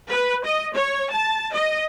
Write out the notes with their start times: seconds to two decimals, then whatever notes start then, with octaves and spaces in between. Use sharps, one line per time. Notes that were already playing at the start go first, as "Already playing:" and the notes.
0.11 B4
0.45 D#5
0.75 C#5
1.12 A5
1.54 D#5